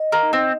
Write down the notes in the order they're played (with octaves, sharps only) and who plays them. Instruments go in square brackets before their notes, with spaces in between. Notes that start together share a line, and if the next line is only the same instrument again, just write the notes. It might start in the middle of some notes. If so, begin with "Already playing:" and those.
Already playing: [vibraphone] D#5
[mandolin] A#3
[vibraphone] D#4
[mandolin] C4